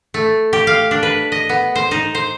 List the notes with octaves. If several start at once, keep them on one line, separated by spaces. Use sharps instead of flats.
A3
G4
F5
D4
B4
D#5
B3
C5
D#4
C5